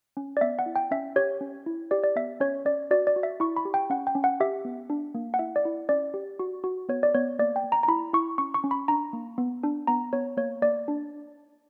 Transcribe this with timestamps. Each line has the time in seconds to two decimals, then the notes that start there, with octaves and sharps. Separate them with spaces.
0.17 C#4
0.37 D5
0.41 B3 E5
0.59 F#5
0.66 E4
0.76 G5
0.91 C#4 E5
1.16 G4 C#5
1.41 C#4
1.66 E4
1.91 G4 D5
2.04 D5
2.16 B3 E5
2.40 C#4 C#5
2.65 C#4 D5
2.91 F#4 D5
3.07 D5
3.16 F#4
3.23 E5
3.40 E4 C#6
3.56 B5
3.65 G4
3.74 G5
3.90 C#4 F#5
4.07 G5
4.15 C#4
4.24 F#5
4.40 G4 E5
4.65 B3
4.90 D4
5.15 A#3
5.34 F#5
5.39 E4 E5
5.56 D5
5.65 E4
5.89 C#4 D5
6.14 G4
6.39 F#4
6.64 F#4
6.89 B3 C#5
7.03 D5
7.14 B3 C#5
7.39 A#3 D5
7.56 G5
7.64 A#3
7.72 A#5
7.83 A#5
7.88 E4 B5
8.13 E4 C#6
8.38 C#4 C#6
8.54 C#6
8.64 C#4
8.71 B5
8.88 D4 A#5
9.13 A#3
9.38 B3
9.64 D4
9.87 B3 A#5
10.13 B3 C#5
10.37 A#3 C#5
10.62 A#3 D5
10.88 D4